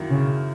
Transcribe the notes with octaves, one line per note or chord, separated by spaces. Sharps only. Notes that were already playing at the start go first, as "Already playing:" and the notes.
Already playing: F#2 D#3 A#3 E4
C#3